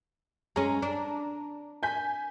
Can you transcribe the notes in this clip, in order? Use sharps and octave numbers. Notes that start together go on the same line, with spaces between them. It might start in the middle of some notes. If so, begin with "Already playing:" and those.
G#3 C#4 A#5
D4
G#5 G6 B6